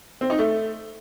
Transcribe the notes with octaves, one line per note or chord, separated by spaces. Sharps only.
C4
D#4
A3